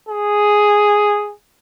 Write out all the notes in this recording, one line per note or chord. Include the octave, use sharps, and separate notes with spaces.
G#4